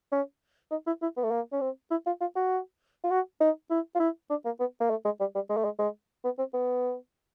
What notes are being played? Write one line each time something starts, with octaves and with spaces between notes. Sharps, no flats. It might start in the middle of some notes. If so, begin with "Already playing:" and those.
C#4
D#4
E4
E4
B3
A3
A#3
C#4
C4
E4
F4
F4
F#4
F4
F#4
D#4
E4
F4
E4
D4
A#3
B3
A#3
A3
G#3
G3
G3
G#3
A3
G#3
G#3
B3
C4
B3